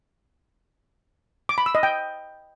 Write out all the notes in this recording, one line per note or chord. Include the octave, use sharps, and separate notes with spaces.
D6
B5
E6
D#5
G5